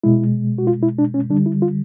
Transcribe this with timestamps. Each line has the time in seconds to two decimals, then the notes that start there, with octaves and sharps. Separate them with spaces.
0.03 B2 G#3 E4
0.58 F#4
0.67 F4
0.82 E4
0.99 D4
1.14 C#4
1.30 D3 G3 D4
1.46 E4
1.62 F4